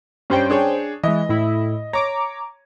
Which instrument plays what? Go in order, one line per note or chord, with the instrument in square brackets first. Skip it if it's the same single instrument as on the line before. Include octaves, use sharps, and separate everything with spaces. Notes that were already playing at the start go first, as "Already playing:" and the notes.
[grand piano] G2 G3 C#5 [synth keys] C#4 C5 G5
[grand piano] D4 G#4 C#5
[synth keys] E3 G#3 [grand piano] D#5
[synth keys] A2 E4
[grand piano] C#5 [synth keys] A#5 D6